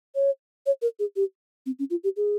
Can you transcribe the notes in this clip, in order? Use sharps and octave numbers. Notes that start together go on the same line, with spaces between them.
C#5
C#5
A#4
G#4
G4
C4
C#4
F4
G4
G#4